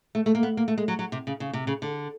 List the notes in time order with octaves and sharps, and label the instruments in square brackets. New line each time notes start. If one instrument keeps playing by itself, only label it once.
[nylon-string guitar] A3
A3
A#3
B3
A#3
A3
G#3
F#3
F#3
C3
C#3
C#3
C3
C#3
D3